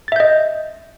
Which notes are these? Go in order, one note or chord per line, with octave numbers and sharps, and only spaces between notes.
D#5 E5 G6 A6